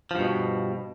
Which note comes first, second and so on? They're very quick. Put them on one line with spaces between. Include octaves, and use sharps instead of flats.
F3 G2 B2